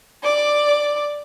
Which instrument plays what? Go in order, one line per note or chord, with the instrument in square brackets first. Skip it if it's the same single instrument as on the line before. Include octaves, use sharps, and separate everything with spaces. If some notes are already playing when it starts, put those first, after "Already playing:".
[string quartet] D5 D6